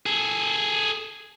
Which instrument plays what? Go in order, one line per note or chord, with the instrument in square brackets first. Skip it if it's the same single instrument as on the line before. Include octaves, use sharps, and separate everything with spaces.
[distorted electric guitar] G#4 A4